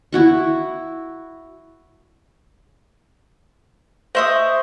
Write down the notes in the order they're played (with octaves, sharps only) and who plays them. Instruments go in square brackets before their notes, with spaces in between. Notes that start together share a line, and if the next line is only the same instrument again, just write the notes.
[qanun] E4 F#4 C#6
[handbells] C5 C6 C#6 [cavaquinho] D#5 E5 D#6